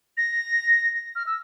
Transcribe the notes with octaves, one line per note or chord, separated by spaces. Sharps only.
A#6
F6
E6